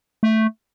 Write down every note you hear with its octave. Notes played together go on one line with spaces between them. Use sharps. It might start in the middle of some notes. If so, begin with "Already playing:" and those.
A3